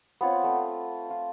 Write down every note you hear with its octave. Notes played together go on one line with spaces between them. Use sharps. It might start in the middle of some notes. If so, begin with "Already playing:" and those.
B3 C4 F4 C#5
A3 C4
F4